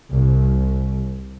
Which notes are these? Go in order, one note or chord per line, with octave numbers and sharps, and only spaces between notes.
C2